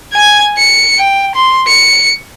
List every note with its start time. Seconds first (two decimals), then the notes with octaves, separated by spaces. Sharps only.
0.13 G#5 G#6
0.58 C#7
0.98 G5
1.35 C6
1.68 C#7